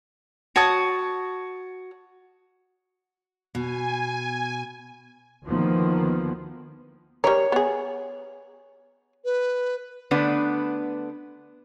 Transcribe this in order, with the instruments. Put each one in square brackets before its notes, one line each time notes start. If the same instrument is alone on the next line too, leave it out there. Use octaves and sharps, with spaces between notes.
[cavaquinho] F#4 C#5 A5 D#6
[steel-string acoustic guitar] B2 [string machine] G#5
[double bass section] D2 D#3 F3 A#3 B3
[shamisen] G3 A#4 [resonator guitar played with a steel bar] C#5
[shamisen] B3 G#4
[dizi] B4
[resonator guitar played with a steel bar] D3 A3 B3 D4 B4